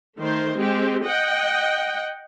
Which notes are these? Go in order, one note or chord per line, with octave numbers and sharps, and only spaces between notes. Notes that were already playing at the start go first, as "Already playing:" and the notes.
D#3 A3 C5
G#3 C4 G4
D#5 F#5 G5